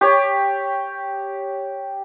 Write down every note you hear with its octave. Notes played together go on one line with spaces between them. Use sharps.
G4 C#5